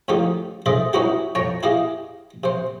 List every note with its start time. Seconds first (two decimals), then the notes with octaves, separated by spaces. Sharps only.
0.08 A2 C#3 F3 D#4 G4
0.66 D4 G#4 A4 C5 D#5 E5
0.93 B3 C#4 D#4 E4 F#4 G4
1.35 F2 C#5 G5 A5 A#5
1.63 E4 G4 G#4 D#5 F5
2.44 C3 C5